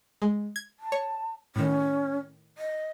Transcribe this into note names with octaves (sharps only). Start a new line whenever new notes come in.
G#3
G#6
A5
C#5
A2 D#3 C#4
D#5